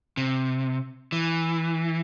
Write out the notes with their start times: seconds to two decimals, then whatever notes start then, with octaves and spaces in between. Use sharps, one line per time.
0.17 C3
1.12 E3